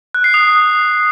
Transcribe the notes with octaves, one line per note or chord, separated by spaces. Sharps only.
F#6
C7
D#6